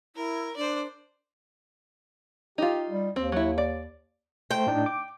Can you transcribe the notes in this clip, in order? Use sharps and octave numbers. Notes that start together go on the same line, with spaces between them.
E4 A#4
D4 C5 D5
D#4 F4 G4
G3
D#2 C4
F#3 E4
D5
A3 C5 G5
A2 D4 D#4
D6